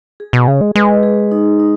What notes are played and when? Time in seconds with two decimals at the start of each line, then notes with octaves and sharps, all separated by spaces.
0.20 G#4
0.33 B2
0.48 C#3 G#4
0.61 G#3
0.75 G#3 B4
1.03 G#4
1.31 D#4
1.59 D#4